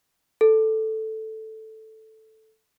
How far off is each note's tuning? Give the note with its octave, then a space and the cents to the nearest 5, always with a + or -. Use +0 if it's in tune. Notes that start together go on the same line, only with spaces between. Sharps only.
A4 +0